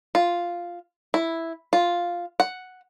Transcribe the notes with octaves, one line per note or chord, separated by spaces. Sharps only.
F4
E4
F4
F#5